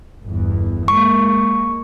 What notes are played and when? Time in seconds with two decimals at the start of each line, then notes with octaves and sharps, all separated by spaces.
0.22 G1 E2
0.88 G#3 A#3 C#6